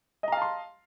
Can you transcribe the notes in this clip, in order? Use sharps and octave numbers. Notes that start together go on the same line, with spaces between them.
D#5 F5 A5 A#5 C6